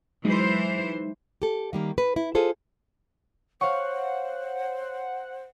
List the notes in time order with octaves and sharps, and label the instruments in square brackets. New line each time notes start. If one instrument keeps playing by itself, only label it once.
[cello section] E3 C5 [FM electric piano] F#3 G#3 D#4
[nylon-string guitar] G4 A4
D#3 G3 A#3
B4
E4
F4 G#4 A4 C5
[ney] C5 [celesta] C#5 [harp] F5 C#6 [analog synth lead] F#5